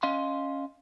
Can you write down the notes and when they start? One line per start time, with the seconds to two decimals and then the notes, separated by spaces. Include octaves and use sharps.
0.03 C#4 D#5 F5 C6